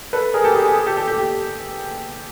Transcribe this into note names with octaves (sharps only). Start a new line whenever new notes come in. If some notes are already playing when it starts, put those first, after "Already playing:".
A4 B4
G#4 A#4
G4 A4
G#4
G#4
G#4
G4 A4
G4 A4
G4 A4
G4